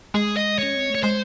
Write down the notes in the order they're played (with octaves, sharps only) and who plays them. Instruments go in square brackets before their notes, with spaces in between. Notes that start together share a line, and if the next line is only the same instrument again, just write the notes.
[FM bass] G#3 [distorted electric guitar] G#4
[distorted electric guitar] D#5
[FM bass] C#4 [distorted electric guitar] C#5
[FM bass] C4
A3
[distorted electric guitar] C#5
[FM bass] G#3 [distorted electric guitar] C5